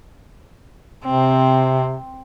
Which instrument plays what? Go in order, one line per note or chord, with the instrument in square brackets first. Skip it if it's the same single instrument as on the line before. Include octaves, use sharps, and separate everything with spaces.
[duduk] C3 [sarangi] C4